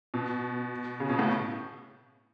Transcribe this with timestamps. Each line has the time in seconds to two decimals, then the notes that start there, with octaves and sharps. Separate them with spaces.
0.14 B2
1.00 C#3
1.09 B2
1.19 A2